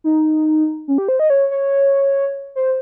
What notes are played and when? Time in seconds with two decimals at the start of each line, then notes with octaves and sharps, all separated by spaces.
0.04 D#4
0.88 C#4
0.98 G4
1.08 C5
1.20 D#5
1.30 C#5
1.51 C#5
2.56 C5